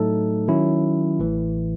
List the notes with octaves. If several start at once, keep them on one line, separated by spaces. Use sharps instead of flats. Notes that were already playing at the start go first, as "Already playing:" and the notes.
Already playing: A2 F#3 A3 D#4 A4
D#3 F#3 C#4 E4
A1 A2 E3